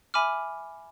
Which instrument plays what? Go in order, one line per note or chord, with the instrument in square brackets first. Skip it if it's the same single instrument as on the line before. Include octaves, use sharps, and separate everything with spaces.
[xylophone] E5 G#5 B5 D6 F6